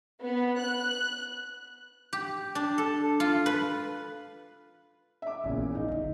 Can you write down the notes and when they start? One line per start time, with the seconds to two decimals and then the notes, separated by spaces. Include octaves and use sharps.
0.22 B3
0.59 F#6
2.13 G4
2.55 D4
2.78 A4
3.20 F4
3.46 B4
5.22 E5 D6
5.44 A#1 E2 A#2 C#3
5.75 F3 D#4
5.88 D2 C#4